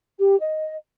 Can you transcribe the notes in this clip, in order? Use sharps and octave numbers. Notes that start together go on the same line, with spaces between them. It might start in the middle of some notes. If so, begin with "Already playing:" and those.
G4
D#5